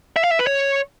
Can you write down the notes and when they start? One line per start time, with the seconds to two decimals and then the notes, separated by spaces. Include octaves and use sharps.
0.16 E5
0.24 F5
0.32 E5
0.39 B4
0.47 C#5